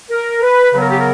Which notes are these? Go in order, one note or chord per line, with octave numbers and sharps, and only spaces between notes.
A#4
B4
C#3 F#3 B3 B4
A#4
G4
A#4